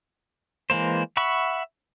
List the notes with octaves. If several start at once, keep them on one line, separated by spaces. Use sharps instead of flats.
E3 G#3 A#3 C5
E5 F#5 B5 C#6